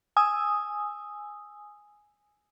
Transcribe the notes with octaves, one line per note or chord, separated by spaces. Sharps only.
G#5 D#6 E6